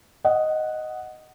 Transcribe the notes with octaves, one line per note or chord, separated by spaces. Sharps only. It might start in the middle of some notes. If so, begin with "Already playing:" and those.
D#5 F#5